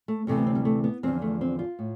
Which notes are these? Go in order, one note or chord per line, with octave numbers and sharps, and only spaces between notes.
A3
D2 C3 E3 A3
B3
C4
G3
A3
B3
E2 D3 F3 C4
A3
C4
F4
A2